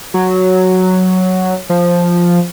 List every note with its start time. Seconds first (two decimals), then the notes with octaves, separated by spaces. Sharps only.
0.14 F#3
1.70 F3